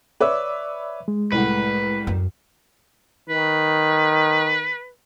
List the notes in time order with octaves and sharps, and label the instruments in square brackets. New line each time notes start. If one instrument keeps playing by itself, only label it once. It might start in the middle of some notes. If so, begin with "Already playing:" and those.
[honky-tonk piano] B4 C#5 E5 [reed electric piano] D5 D6 E6
[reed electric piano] G#3
[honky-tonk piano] C2 A2 F#5 [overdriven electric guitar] B4
[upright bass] F#2
[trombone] D#3 [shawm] B4